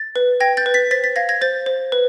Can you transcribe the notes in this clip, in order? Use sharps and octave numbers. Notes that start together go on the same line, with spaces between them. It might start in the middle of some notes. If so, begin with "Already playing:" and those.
Already playing: A6
B4
G5 G#6 A#6
G6 A6
B4
A6 B6
C5 A6 B6
A6 B6
F5 G#6 A#6
G#6 A#6
C5 G6 A6
C5
B4